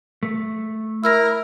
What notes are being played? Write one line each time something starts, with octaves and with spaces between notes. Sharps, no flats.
A3
E4 A#4 E6 F6 A#6